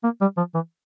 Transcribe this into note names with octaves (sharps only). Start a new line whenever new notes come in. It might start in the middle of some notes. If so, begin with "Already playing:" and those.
A#3
G3
F3
E3